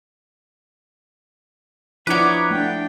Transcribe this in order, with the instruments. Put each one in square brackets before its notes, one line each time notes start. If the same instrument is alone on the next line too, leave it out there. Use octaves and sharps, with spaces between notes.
[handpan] F3 D4 E4 [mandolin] B3 D6 [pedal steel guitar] B4 C#5 [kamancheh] A#5
[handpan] A3 [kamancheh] D4 G5